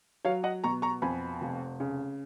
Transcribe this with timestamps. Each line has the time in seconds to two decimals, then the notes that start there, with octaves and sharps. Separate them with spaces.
0.25 F#3 C#5 F5
0.44 D#5 F#5
0.64 B2 A#5 C#6
0.82 A#5 C#6
1.02 F2 G#5 B5
1.41 F1
1.80 C#3